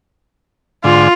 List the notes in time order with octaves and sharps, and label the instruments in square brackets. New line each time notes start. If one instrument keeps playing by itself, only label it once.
[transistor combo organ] G#2 D3 [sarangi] F4